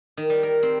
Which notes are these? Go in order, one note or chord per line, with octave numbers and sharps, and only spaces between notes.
D#3
G3
A#4
C4